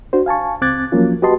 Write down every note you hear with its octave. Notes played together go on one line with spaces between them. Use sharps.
D4 F#4 C5
F5 G#5 A5 C#6
C#2 C4 D6 F#6 G#6 A6
F3 F#3 A#3 C#4 F4
F#4 G4 B4 D#5 A5 C6